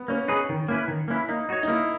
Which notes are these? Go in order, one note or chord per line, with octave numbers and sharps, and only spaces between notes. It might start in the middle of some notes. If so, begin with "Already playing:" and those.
Already playing: B3
A#3 C#4
D#4 G#4 B4
D#3
A#3 C#4 E4 B4
D#3
A#3 C#4 E4 B4
A#3 D#4
D#4 F#4 C#5
D#4
A#3 E4